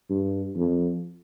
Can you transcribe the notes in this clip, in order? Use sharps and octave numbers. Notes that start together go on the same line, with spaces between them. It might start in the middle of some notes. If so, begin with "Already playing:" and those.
G2
F2